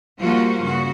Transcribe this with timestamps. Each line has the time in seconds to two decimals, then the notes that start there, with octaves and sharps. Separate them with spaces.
0.19 F3 G3 A#3 F4 F#4
0.61 G2 C#3 F#4